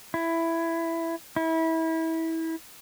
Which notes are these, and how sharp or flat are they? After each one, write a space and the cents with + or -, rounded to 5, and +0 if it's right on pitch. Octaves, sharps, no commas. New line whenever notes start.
E4 +10
E4 -25